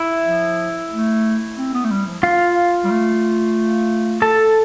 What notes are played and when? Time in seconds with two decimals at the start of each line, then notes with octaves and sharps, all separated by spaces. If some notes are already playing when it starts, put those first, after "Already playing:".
Already playing: E4 E5
0.25 F3
0.92 A3
1.57 C4
1.74 B3
1.84 A3
1.91 G3
2.07 F3
2.23 F4 F5
2.84 G3
2.90 A3
4.22 A4 A5